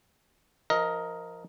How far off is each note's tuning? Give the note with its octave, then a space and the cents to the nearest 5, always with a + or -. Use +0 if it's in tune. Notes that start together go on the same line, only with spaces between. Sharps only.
F3 -15 A#4 +0 D#5 +15